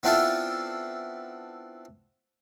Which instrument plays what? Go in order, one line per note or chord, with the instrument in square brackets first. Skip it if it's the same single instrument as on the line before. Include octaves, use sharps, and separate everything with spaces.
[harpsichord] B3 C4 D4 E4 F4 A4